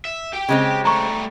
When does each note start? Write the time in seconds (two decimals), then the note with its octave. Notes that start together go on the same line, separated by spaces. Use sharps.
0.05 E5
0.33 G4 G5
0.49 C#3 G#3 C4
0.85 G3 A3 A#5 C#6